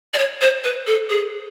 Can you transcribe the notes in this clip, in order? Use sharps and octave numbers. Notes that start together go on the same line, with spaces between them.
D5
C#5
C5
B4
A4
G#4